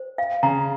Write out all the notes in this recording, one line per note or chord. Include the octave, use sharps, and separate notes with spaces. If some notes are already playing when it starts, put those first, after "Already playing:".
Already playing: C5
F5
C#3 A#5